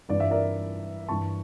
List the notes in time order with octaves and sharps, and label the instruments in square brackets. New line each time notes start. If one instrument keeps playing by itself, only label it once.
[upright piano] G2 E3 D5
E5
A#4 D5
G2 E3 A5 C#6